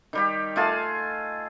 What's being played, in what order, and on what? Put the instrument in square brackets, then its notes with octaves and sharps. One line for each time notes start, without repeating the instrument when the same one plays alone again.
[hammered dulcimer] D#3 G3 G4
A3 F4 G#4 A5